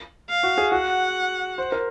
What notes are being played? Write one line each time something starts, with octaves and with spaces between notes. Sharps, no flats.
F5
F#4
G#4
F#4 F#5
C5
A#4